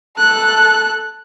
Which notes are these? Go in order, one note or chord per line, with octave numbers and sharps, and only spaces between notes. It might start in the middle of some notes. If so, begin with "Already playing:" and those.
A4 F#6